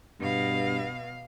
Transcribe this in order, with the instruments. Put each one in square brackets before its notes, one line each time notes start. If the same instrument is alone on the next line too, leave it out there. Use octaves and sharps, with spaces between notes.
[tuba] G2 [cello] B2 F5